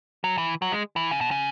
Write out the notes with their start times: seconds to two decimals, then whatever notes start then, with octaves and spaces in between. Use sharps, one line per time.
0.24 F#3
0.38 E3
0.62 F#3
0.72 G#3
0.96 E3
1.11 C#3
1.21 B2
1.31 C#3